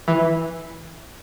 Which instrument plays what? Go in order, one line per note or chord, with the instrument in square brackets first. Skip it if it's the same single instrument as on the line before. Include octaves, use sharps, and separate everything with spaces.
[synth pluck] E3